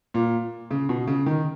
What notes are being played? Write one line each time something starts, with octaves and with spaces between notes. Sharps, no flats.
A#2
C#3
B2
C#3
D#3